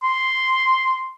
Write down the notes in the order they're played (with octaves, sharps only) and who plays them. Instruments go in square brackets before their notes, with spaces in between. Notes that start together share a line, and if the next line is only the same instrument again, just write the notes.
[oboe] C6